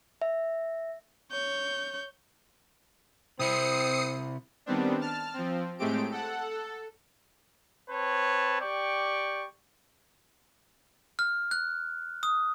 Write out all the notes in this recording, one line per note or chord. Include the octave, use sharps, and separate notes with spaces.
E5
C#5 G6
C3 C4 E4 D#6 C7 C#7
D#3 G3 B3 C4 D4
A5 F6
F3 C4
A2 G#3 A3 C4 G4 D7
A4 F#5
A4
C4 B4 C#5 A5
G4 D5 G5 C#6
F6
F#6
D#6